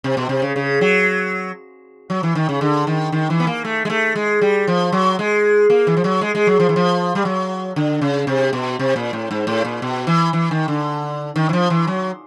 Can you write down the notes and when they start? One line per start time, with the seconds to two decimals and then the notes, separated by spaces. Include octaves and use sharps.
0.04 C3
0.17 B2
0.29 C3
0.42 C#3
0.56 C#3
0.81 F#3
2.10 F#3
2.23 E3
2.35 D#3
2.49 C#3
2.61 D3
2.87 D#3
3.12 D#3
3.30 E3
3.40 B3
3.47 A#3
3.65 A3
3.85 G#3
3.90 A3
4.16 G#3
4.41 G3
4.67 F3
4.92 F#3
5.19 G#3
5.70 A#3
5.87 E3
5.97 F3
6.04 F#3
6.21 G#3
6.35 G#3
6.47 F#3
6.60 F3
6.69 E3
6.76 F3
7.15 G3
7.25 F#3
7.76 D3
8.01 C#3
8.27 C3
8.53 B2
8.79 C3
8.96 A#2
9.13 A2
9.31 G#2
9.47 A2
9.65 A#2
9.82 B2
10.07 E3
10.33 E3
10.51 D#3
10.68 D3
11.36 D#3
11.49 E3
11.53 F3
11.70 E3
11.87 F#3